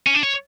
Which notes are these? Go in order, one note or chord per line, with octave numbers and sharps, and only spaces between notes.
C#4
D4
C#5